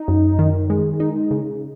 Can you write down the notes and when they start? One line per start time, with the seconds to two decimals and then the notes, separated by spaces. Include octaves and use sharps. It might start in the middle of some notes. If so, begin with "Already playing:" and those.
Already playing: D#4
0.08 F#2
0.39 D#3
0.70 G#3
1.00 D#4
1.31 C#3